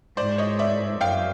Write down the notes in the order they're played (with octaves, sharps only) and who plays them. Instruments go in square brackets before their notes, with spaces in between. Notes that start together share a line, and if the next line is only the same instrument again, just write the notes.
[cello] G#2 [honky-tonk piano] C5 D5
[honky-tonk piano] C#5 D#5
D5 E5
[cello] F#2 [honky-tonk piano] F5 G5